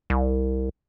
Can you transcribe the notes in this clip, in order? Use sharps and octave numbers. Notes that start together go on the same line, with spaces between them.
C2